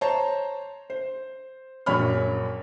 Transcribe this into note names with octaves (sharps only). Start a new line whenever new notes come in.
C5 C#5 A5 A#5
C5
A#1 F#2 C#5 B5 F6